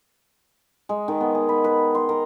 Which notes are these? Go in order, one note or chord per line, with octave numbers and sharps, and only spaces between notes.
G#3
D#3
B3
G#4
B5
B4
C6
A#4